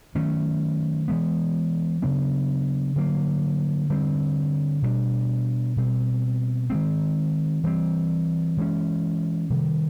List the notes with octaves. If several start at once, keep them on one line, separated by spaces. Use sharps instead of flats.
D#3 F#3 A3 C#4
E3 G#3 B3
C#3 F#3 B3 D4
D3 F#3 A#3
D3 G3 C4
B2 G3 B3 D4
B2 G3 C4
D#3 G#3 C4
E3 G3 C4
E3 G#3 C#4
C3 D#3 G3